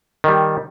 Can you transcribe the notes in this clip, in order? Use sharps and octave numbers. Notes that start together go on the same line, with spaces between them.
D#3 G3